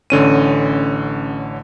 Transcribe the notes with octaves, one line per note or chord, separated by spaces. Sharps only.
A1 D3 C#4 D#7